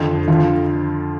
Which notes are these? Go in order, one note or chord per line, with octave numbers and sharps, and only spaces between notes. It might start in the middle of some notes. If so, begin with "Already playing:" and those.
Already playing: F2 D3 F3
F2 D3 F3 F4